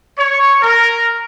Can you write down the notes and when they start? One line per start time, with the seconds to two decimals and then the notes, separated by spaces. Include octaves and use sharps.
0.19 C#5
0.62 A#4